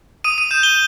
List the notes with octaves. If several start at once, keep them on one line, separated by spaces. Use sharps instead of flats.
D#6 D#7
D#7
G6 E7
G7